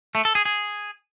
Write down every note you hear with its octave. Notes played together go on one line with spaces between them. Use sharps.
A3
A4
G#4
G#4